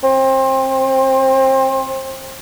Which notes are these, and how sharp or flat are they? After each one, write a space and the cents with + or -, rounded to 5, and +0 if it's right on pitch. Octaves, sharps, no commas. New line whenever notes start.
C4 +25